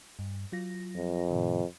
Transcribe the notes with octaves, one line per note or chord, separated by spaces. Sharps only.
G2
F#3 F4 A#6
F2
A2 C3 D#3